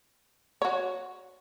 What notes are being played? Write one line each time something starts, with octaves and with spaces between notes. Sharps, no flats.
F#4 C#5